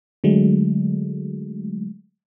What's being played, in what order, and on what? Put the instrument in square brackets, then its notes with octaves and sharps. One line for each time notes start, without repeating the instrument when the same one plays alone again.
[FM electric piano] D3 F#3 G#3 A3